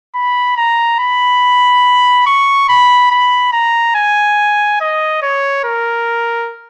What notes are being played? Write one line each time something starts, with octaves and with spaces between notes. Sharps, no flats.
B5
A#5
B5
C#6
B5
B5
A#5
G#5
D#5
C#5
A#4